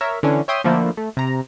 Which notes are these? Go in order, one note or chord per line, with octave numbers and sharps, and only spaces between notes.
A#4 C#5 E5
D3 E3 C#4 D4
C#5 E5 G5 C6 D#6
D3 F3 A3 A#3 E4 C5
A3
C3 A#5